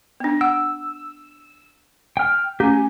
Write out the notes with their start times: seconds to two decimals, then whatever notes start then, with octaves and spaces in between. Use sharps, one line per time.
0.20 B3 D4
0.41 F#5 E6
2.17 G5 F6
2.60 A3 C#4 G4 G#5